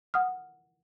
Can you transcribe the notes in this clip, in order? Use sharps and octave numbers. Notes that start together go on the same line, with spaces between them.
F#5 D#6 F6